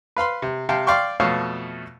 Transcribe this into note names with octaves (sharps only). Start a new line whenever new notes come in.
B4 F5 B5 C6
C3
C3 F5 G5 A5
D5 F5 G5 C6 C#6
F2 B2 A3 C#5 F5 F6